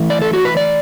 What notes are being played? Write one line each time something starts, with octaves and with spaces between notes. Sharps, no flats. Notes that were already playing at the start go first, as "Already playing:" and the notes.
Already playing: E3 A3 E4
D5
A4
F#4
B4
D5